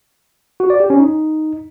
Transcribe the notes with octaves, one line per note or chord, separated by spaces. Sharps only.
F#4
D5
G4
C#4
D#4